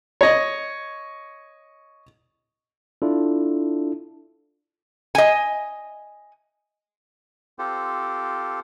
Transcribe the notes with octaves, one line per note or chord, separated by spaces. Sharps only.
C#5 D#5
D4 E4 F4 A4
D#5 G#5
C4 F4 G4 A4 C5